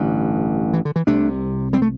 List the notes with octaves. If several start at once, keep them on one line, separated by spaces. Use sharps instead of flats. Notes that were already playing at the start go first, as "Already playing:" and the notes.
Already playing: A1 G2 D3
E3
D3
E3
C2 C3 A3 D4
G3 C4
A3